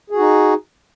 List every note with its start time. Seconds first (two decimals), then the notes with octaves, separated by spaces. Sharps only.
0.10 G#4
0.15 F#4
0.20 D#4